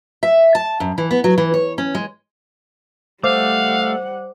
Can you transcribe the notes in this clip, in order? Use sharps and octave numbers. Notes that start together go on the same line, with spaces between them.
E5
A5
F#2
E3
B3
F#3
E3
C#5
C#4
G#3
G3 A3 C5 F5 F#5 D6